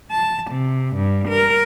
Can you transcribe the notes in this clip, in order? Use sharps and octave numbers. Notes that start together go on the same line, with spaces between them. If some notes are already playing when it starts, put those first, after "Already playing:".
A5
C3
G2
A#4